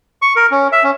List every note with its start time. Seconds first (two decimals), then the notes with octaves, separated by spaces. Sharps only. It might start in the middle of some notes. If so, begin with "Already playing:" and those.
0.22 C#6
0.36 A#4
0.51 C#4
0.72 E5
0.84 C#4